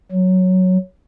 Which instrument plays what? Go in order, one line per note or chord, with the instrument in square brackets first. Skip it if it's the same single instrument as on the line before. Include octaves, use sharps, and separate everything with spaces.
[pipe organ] F#3